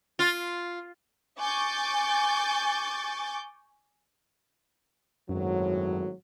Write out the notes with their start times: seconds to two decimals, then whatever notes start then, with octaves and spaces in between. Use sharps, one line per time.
0.19 F4
1.39 G#5 C#6 D6 G6 A6
5.29 G#1 F#2 A2 F#3